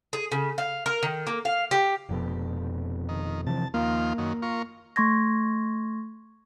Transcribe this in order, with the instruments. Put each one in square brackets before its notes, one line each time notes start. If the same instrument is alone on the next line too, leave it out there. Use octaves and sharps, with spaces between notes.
[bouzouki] G#4
C#3
F5
A#4
D#3
A#3
F5
G4
[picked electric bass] F1 F2 B2
[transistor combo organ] D#3
[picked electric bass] C3 E3 F3 [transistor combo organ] A5
[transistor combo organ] D#2 F3 F4 [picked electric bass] A#3
[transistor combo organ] F#2 D#3
F4 A#4 C#6
[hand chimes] A3 C6 C#6 G#6 A#6